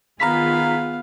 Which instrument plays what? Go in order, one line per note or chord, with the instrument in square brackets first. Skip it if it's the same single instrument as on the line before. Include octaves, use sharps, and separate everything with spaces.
[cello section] D#3 F4 G#4 [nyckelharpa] B3 F5 [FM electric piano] A#5 B5 B6